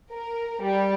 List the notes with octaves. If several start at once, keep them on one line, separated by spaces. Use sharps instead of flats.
A#4
G3